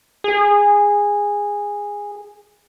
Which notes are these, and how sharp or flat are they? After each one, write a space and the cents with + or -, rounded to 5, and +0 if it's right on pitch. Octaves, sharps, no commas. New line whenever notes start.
G#4 -15